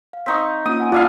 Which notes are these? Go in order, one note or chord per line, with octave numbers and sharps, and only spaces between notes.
F5
C4 D#4 C#6 B6
A#3 C#4 F4 D#6
F#5 G#5
D4 E4 F4 F5